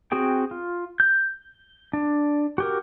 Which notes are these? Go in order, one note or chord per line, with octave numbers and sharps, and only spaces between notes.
C4 F#4 G#4 G5
F4
G6
D4
F#4 G4 A#4